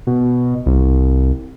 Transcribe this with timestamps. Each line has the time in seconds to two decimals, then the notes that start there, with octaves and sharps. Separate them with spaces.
0.07 B2
0.66 C2